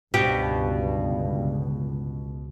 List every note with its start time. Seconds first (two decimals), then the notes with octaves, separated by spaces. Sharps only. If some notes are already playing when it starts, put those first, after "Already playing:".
0.14 G1 C#2 G2 B2 G4